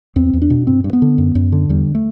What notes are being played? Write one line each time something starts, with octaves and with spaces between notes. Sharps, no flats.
E2 C4
E2
D4
B2
G2 C4
G2
B3
D3
F#2
F#2
D3
E2 G3
A3